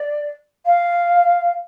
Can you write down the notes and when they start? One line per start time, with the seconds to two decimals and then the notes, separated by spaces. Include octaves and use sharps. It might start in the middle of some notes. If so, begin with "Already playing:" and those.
Already playing: D5
0.65 F5